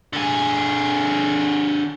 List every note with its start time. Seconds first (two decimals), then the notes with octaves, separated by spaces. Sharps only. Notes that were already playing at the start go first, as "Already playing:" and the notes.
0.13 D3 G#4